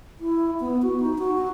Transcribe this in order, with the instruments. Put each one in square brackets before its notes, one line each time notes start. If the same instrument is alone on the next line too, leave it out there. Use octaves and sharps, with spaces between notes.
[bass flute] E4
B3
F#4
D#4
F#4